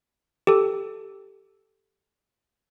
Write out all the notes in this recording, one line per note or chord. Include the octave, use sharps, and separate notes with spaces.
G4 A4